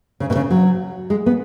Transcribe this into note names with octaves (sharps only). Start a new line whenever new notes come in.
C#3
B2
C#3
F#3
G#3
B3